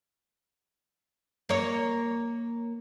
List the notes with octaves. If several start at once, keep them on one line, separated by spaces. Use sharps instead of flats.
A#3 C#5